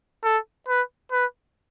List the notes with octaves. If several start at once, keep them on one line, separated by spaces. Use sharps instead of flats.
A4
B4
B4